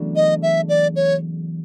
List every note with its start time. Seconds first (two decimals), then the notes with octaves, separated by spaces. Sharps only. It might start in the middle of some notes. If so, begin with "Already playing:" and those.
Already playing: E2 C#3 F#3 A3 D4
0.16 D#5
0.43 E5
0.69 D5
0.96 C#5